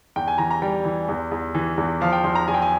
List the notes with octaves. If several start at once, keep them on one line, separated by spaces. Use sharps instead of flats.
E2 G5
G#5
E3 A#5
A#5
G3 G5
E3
E2
E2
E3
E2
F3 F5
G5
E2 C6
A#5
E2 G#5
G5
G#5